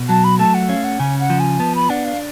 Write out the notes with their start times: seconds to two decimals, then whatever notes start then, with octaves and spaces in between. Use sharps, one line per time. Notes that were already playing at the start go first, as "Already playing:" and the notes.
Already playing: B2
0.09 F#3 A5
0.24 B5
0.39 A3 A5
0.54 F#5
0.69 C#4 F5
0.84 F#5
0.99 C#3 G#5
1.19 F#5
1.30 F3
1.39 G#5
1.59 B3 A5
1.75 B5
1.90 D4 F#5
2.05 F5